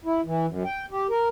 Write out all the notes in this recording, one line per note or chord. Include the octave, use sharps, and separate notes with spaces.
E4
E3
F#2
G5
G4
A#4